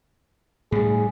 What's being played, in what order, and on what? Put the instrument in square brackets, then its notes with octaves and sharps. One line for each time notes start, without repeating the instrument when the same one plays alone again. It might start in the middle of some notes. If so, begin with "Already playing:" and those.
[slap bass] A2 G3 [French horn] G#4